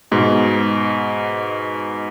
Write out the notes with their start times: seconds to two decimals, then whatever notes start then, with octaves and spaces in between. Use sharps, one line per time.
0.11 G#2 B2